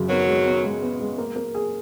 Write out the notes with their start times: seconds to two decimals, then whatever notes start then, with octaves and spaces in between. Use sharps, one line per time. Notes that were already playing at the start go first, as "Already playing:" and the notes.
Already playing: F#2 C#3
0.09 D#3 F#3 B3
0.27 G#3
0.46 B3
0.63 G#3
0.82 B3
1.00 G#3
1.18 A#3
1.36 A#3
1.55 G#4